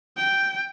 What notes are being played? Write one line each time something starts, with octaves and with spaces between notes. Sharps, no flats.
G5